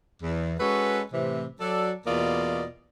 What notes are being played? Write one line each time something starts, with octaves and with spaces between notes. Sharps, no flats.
E2
G#3 C#4 F#4 A4 B4
A2 C3 E3
F#3 A4 D5
E2 B2 A#3 F4 D5 D#5